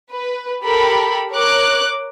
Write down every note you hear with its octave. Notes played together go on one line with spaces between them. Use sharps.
B4
G4 A4 A#4 B5
A#4 C#5 D6 F#6